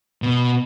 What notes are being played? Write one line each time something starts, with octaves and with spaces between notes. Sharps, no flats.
B2